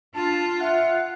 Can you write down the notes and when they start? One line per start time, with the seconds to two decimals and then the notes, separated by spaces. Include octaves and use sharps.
0.15 D4 F4 A5
0.60 E5 F#5